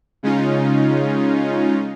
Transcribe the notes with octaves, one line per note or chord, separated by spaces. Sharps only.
C#3 G#3 C#4 D#4 F4